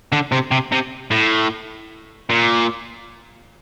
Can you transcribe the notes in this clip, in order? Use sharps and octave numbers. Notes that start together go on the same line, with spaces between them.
D3
C3
C3
C3
A2
A#2